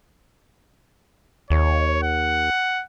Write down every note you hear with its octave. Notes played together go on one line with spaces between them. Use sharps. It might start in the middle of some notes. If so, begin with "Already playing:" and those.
D#2 C#5
F#5